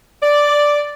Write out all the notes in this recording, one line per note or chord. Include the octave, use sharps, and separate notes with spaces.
D5